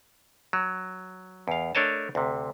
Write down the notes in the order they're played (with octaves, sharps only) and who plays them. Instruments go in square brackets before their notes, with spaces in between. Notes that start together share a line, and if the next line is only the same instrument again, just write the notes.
[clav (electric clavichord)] F#3
E2 F5
A3 D4 A#4 C#5 D#5 A5
D2 C3